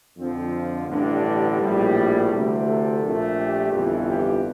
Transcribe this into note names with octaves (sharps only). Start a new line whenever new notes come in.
F2 D3 F3 C4
A1 G2 D3 D4
A#1 A2 G3
G4
D2 C3 E3 A3
A4
A#1 A#2 A3
G4
G1 F2 E3
G4